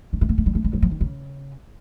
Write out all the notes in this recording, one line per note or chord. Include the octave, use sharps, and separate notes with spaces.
G#3
A3
A#3
A3
G3
A3
G#3
F#3
F3
D#3
C#3